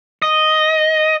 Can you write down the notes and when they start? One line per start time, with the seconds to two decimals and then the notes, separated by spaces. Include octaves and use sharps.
0.22 D#5